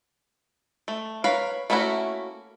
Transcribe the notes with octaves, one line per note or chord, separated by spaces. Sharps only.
A3
A#4 B4 C#5 F5
A3 A#3 C#4 E4 F#4